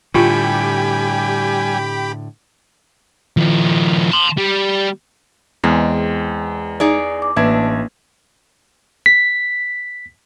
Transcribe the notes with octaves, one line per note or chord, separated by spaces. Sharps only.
A2 D3 G3 F4 G4 G5 G#5 B5
D#3 F3
A5 C6
G3
E2 G#3 C4
D#4 G#4 D5
D6
A1 A#3 D4 B4 E5 G#6
B6